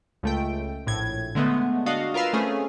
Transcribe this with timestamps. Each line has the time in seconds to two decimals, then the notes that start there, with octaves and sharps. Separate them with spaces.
0.23 C#2 A3 G5
0.87 A#1 A2 G#6
1.35 D3 G#3 A3 B3
1.86 D4 F#4 D#5 F5
2.14 F4 A#4 B4 F5 E6
2.33 A3 C4 C#4 G#4